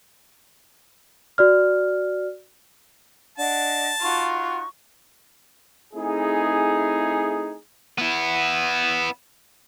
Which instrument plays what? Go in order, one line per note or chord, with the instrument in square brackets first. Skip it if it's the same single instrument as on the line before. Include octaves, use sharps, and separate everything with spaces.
[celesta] F#4 D5 F6
[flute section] D4 D#5 [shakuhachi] F#5 [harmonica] A5
[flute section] D#4 F#4 [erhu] F4 [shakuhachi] C#6
[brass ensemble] A3 C4 D#4 E4 G#4
[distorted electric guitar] B3 E4